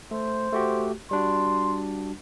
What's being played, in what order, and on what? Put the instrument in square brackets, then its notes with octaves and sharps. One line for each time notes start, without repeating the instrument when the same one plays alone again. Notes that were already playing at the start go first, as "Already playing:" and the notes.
[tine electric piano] A3 [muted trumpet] C5
[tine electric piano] A3 F#4 G4
[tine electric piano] G3 D4 F#4 [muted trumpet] C6